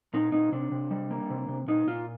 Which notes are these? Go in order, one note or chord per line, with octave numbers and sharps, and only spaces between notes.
A#2 D#4
A#2 D#4
C3 D4
C3
G3
A#3
C3
C3
A#2 D#4
A#2 F4